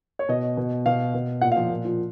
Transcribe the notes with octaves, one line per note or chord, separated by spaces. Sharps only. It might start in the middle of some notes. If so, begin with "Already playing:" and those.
C#5
B2 D#5
B2
B2 F5
B2
A#2 F#5
F5
F3
A#2
F3